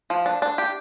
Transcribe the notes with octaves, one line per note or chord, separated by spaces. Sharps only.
F3
D4
D4
G4